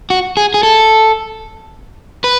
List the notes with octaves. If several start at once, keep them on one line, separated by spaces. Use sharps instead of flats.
F#4
G#4
G#4
A4
B4